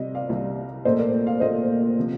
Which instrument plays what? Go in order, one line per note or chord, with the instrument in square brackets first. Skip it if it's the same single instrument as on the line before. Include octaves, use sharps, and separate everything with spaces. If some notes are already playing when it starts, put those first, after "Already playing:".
Already playing: [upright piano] C3 G3 D#5
D5 F5
C2 C3 G3
A#1 A#2 A3 C5 D#5
A#4 D5
D5 F5
A#1 A#2 A3 C5 D#5
C3 F3